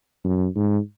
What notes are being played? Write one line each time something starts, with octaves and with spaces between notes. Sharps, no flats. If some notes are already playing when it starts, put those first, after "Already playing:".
F#2
G#2